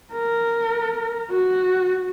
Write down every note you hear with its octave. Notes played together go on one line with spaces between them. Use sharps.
A#4
F#4